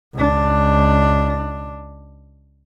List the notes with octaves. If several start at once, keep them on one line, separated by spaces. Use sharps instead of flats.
C#2 D4